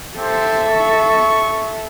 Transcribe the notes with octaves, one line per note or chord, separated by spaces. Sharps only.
C4 G4 A4 C5 E5
C#6